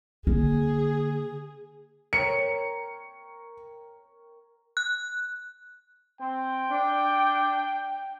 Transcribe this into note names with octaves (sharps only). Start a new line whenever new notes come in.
D3 A#3 G#4
A#4 C#5 G5 C#7
F#6
C4 G5
D4